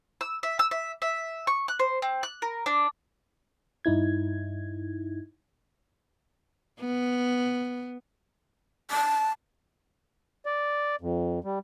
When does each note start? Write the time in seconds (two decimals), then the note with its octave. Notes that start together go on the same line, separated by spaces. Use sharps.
0.21 E6
0.43 E5
0.59 E6
0.71 E5
1.02 E5
1.47 C#6
1.68 F#6
1.79 C5
2.02 C4
2.23 F#6
2.42 A#4
2.66 D4
3.85 G2 D#4 E4 G#6
6.81 B3
8.91 A5
10.46 D5
11.01 F2
11.44 G3